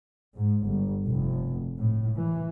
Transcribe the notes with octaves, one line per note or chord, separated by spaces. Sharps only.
G#2
G1
F1
A2
E3